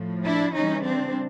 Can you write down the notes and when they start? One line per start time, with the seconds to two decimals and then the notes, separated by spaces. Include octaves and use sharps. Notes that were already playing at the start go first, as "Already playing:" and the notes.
Already playing: A2 F3
0.23 D4 E4
0.54 C#3 E3 G3 C#4 D#4
0.84 C4 D4